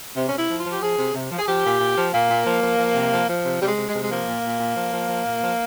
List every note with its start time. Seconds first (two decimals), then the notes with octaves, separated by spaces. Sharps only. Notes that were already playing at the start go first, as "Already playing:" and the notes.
0.16 C3
0.28 C3 C#4
0.38 E4
0.49 F3
0.59 F4
0.65 F3
0.71 G4
0.81 F3 G#4
0.98 C3
1.14 C3
1.31 F3
1.39 G#4
1.47 F3 G4
1.64 A#2
1.80 A#2
1.96 F3
2.13 A#2 A#3
2.30 A#2
2.46 F3
2.62 F3
2.79 F3
2.95 C3
3.12 F3
3.28 F3
3.45 C3
3.61 C3 G3
3.67 G#3
3.78 C3
3.89 G#3
3.94 C3
4.02 G#3
4.10 F3 A#3
4.27 A#2
4.44 A#2
4.60 A#2
4.76 F3
4.93 F3
5.09 F3
5.25 A#2
5.42 F3